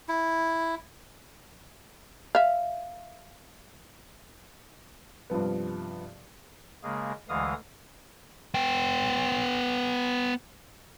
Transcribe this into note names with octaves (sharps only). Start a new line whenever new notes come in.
E4
E5 F5
G2 C3 F3 B3
C#3 G#3 A#3 G#4
D2 D3 E3 G#3 F5 D#6
B3 G5